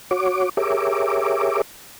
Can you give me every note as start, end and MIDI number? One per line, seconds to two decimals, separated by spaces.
0.11 0.49 66
0.11 0.49 73
0.11 0.49 86
0.57 1.62 67
0.57 1.62 68
0.57 1.62 70
0.57 1.62 73
0.57 1.62 76
0.57 1.62 86